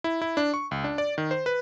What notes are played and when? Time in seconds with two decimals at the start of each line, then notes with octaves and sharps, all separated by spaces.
0.04 E4
0.22 E4
0.37 D4
0.54 C#6
0.71 C#2
0.84 D4
0.98 D5
1.18 D#3
1.31 C5
1.46 B4